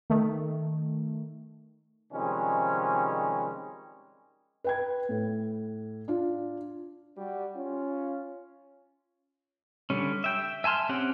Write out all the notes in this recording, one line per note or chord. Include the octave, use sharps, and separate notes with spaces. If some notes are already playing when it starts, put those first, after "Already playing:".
D#3 A3
C3 D#3 F3 G3 G#3 C#4
B4 G5 G#6
A2
D4 F4
G3 F#4
C#4 F4
D3 G3 C#4
E5 G5
E5 G#5 A5 C6 F6
C4 C#4 G4 F#5